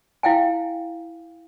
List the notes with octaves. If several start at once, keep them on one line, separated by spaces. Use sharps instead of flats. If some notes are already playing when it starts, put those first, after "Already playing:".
E4 F5 G5 G#5